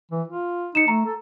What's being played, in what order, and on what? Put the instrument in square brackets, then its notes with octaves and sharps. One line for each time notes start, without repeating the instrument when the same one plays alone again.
[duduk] E3
F4
[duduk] D#4 [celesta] C#7 E7
[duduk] A3 [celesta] A#5
[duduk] A4